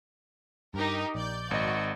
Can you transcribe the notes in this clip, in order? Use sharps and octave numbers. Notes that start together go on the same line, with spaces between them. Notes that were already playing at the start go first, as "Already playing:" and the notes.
G2 D#4 G4 A#4
A#1 D5 G6
G#1 F#4 D#5